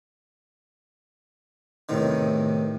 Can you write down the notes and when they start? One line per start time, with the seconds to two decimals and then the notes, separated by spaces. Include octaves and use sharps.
1.89 E2 A2 C3 D#3